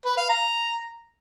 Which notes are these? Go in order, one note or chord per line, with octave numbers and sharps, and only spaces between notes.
B4
F5
A#5